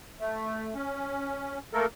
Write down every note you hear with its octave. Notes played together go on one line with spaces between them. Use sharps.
A3
C#4
A3 A#3 A4 A#4